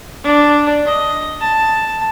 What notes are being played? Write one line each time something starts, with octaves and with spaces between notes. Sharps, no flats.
D4
D#5
A5